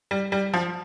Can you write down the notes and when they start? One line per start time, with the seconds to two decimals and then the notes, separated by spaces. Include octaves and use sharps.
0.11 G3
0.32 G3
0.54 F3